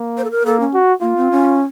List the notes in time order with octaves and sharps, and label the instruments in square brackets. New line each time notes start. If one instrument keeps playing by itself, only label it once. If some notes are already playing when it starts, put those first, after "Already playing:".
Already playing: [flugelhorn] A#3
[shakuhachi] C5
A4
A#4
[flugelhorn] A#3 [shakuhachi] A4
[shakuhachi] C#4
[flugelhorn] F#4
[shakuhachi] A#3 [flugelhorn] F4
[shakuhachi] C4
C#4